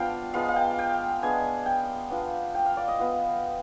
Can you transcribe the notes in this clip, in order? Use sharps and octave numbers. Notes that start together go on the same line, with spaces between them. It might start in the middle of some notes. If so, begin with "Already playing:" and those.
Already playing: F3 B3 D4 F4 F5 G5
F3 G#3 B3 F5
F5
G5
G5
G#3 B3 D4 G#5
G5
B3 D4 F4
G5
F5
D5
D#5
B3 F4